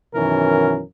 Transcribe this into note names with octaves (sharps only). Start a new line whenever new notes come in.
F#2 B2 D#3 E3 C#4 A#4